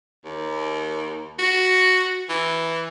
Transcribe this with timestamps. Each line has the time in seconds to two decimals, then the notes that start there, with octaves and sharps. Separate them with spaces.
0.25 D#2
1.39 F#4
2.29 E3